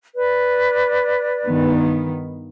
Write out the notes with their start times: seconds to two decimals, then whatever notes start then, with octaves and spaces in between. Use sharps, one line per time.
0.14 B4 D5
1.45 G2 D#3 B3